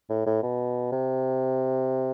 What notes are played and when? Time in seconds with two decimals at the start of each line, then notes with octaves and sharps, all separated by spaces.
0.10 A2
0.26 A2
0.43 B2
0.92 C3